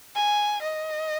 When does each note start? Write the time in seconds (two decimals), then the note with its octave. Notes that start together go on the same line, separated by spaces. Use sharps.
0.15 G#5
0.62 D#5